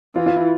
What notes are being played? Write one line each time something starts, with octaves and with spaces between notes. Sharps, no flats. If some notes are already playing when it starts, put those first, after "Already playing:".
E3 F4
F4
E4